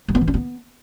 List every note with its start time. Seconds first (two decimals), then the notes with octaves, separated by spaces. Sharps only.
0.08 G3
0.15 B3
0.21 E3
0.28 D4
0.34 B3